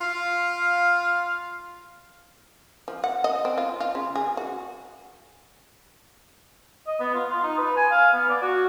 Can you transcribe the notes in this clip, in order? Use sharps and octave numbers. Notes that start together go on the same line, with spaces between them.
F4 F5
F3
F#5
D#5
C4
F4
F4
C#3
G#4
F#4
D#5
B3
F4
F4
D#4
B4
G#5
F5
B3
D5
F#4